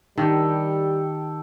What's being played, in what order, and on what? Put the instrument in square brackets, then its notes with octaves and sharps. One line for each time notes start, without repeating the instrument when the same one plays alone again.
[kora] D#3 [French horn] G3 [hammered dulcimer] G4 A4